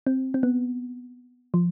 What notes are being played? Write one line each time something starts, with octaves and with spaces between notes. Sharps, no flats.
C4
C4
B3
F3